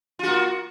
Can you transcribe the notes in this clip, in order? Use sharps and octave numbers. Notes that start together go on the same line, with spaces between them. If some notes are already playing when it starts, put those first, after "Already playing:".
A#3 F4 F#4